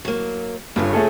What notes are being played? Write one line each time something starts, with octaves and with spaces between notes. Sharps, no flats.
F#3 A#3
G1 G2 C#3 F4 C#5
A3 G#4 A4